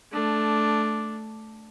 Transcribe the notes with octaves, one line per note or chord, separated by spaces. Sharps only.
A3 D4